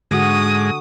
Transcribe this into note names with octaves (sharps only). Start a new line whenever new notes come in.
G#2 D3 G#3 F#4 D#6